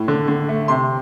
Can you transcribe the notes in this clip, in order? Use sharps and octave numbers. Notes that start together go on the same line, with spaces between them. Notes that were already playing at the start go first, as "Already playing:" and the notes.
Already playing: A2
D3
D3
A3
C3 C6